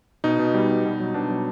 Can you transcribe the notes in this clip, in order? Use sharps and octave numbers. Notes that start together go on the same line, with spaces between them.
B2 D#4
B2
G3
G3
B2
F#3
B2 D4
F#3